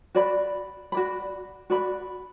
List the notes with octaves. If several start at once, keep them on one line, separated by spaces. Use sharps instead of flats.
F#4 D5 B5
F#4 D5 B5
F#4 D5 B5